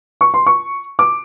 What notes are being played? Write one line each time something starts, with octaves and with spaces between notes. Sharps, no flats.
C#6
C6
C#6
D6